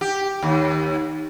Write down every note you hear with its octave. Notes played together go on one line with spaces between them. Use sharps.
G4
D#2